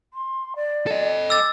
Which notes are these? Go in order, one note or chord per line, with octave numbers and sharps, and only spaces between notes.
C6
D5
A4 D#5
D6 E6 A6